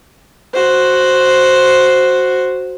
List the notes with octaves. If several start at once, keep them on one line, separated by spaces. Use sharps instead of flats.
F#4 C5